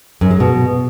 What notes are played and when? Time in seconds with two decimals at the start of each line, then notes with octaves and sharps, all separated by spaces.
0.21 F#2
0.31 G#3
0.40 B2